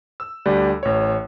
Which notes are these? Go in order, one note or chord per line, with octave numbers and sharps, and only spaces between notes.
E6
D2 G3 F#6
A1 C#5